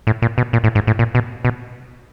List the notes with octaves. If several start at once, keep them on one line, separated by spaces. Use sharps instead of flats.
A2
A#2
B2
A#2
A2
G#2
A2
A#2
B2
B2